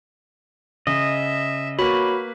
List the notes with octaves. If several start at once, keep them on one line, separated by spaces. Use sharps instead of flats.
C#3 D#5 E5
A#3 F#4 B4 C#5 B5 B6